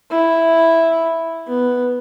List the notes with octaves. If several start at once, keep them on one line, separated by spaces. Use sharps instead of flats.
E4
B3